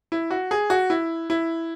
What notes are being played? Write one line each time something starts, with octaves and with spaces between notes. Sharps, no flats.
E4
F#4
G#4
F#4
E4
E4